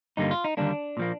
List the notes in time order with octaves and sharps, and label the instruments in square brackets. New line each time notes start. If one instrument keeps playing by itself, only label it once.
[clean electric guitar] G2 D3 G3 A#3 D#4
F4
D#4
D#2 D3 G3 A#3 D4
A#2 F3 A#3